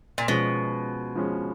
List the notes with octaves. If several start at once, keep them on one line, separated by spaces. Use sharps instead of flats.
A#2
B2 F3 G#3 C#4
F3 G#3 C#4